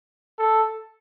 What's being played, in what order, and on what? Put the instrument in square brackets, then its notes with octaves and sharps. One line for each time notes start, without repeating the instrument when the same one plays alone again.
[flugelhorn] A4